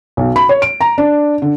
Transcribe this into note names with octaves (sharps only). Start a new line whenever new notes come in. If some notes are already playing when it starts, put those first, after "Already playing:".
B1
B5
C#5
D7
A#5
D4
D3